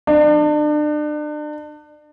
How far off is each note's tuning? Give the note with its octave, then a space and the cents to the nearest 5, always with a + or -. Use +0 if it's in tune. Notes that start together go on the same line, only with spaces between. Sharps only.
D4 +35